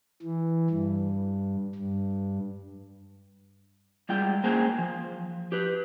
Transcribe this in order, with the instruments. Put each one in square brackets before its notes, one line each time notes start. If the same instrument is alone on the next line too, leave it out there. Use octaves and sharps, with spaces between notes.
[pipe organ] E3
G2
G2
[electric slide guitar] G3 G#3 F4 G5
A#3 C#4 G#4 C5 G5 G#5
F3
G4 B4